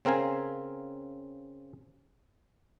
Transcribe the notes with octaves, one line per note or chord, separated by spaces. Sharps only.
C#3 C4 A#4 F5 G#5